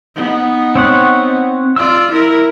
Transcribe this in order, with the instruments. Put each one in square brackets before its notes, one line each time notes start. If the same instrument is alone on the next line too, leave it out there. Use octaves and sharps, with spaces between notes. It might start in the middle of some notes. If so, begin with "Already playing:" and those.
[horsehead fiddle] B3 D#4
[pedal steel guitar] C4 C#5 F#5
[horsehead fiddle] F4 D5 [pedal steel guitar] E6
[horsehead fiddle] E4 A#4